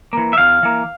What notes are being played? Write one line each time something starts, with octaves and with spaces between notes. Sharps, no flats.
E3 A#3
E5
E2 F5
E3 A#3